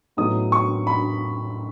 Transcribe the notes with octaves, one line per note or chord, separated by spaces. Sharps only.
A2 F#3 B3 D#4 D#6
C#6
B5